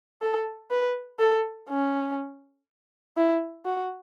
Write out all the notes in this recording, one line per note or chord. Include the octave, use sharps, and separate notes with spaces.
A4
B4
A4
C#4
E4
F#4